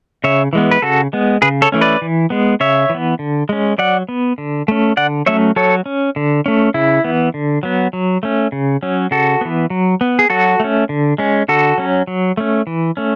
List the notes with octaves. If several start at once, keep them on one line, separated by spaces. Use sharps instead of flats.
C#3 C#5 E5
E3 G#3 B3
B4
C#3 F#4 A4
G#3 B3
C#3 G#4 B4
A4 C#5
E3 A3 C#4
B4 D5
E3
G#3 B3
C#3 C#5 E5
E3 B3
D3
G#3 C#4
F#3 D5 F#5
B3
D3
A3 C#4
D3 D5 F#5
F#3 A3 C#4 C#5 E5
F#3 A4 C#5
C#4
D3
A3 C#4
C#3 E4
E3 B3
D3
F#3 B3
F#3
A3 C#4
C#3
F#3 C#4
C#3 F#4 A4
E3 B3
F#3
B3
G#4
F#3 F#4 A4
A3 C#4
D3
G#3 C#4
D3 F#4 A4
F#3 C#4
F#3
A3 C#4
E3
A3 C#4